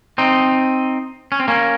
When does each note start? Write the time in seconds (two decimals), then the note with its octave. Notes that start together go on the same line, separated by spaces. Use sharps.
0.18 C4 D#4
1.32 C#4
1.40 C4
1.48 A#3 C#4